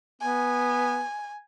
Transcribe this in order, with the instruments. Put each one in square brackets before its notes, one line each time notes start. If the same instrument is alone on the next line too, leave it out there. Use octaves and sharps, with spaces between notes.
[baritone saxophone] B3 [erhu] G#5